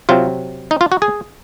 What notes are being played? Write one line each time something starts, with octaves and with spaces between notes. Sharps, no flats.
C3 F#3 C4 F4
D#4
F4
F#4
G#4